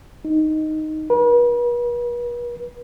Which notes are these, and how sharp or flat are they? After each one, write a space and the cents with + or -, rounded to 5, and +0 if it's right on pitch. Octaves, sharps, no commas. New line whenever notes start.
D#4 +0
B4 -45